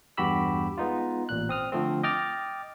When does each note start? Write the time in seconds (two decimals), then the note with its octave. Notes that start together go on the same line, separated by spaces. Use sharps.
0.17 E2 G2 F#4 G4 B5 E6
0.78 G#3 B3 D#4 F4
1.29 A1 A#2 F#6
1.49 C4 D#6 F6
1.72 D3 F3 A3 C4
2.03 D#5 G5 D6 F6 A6